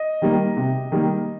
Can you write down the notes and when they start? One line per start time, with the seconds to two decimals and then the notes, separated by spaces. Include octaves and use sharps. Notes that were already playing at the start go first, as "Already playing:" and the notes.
Already playing: D#5
0.22 D#3 G3 A#3
0.57 C3
0.92 D#3 G3 A#3